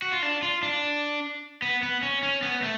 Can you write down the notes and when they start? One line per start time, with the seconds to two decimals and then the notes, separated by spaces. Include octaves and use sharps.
0.02 F#4
0.12 F4
0.23 D4
0.42 F4
0.63 D4
1.62 B3
1.83 B3
2.03 C#4
2.23 C#4
2.43 B3
2.62 A3